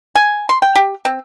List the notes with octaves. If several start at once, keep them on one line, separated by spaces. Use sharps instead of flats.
G#5
C6
G5
G4
C4